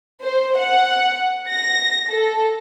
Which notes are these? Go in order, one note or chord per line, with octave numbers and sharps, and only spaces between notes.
C5
F#5
A#6
A4